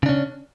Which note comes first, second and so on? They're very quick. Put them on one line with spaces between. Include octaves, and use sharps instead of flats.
C#3 D4 C#4